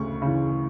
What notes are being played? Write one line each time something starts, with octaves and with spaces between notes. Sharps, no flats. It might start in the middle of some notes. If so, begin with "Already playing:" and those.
Already playing: D2 C#3 C#6
C#3 E3